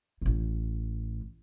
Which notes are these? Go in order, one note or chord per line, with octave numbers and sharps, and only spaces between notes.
A1 A2